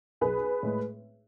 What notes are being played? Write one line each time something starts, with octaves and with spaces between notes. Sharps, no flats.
B1 G#4 B4
A2 G#3